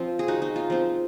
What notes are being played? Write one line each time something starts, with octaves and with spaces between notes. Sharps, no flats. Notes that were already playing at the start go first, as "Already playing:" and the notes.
Already playing: F3 C4 F4
G#4
D#4 F#4
D#4
F4
F3 C4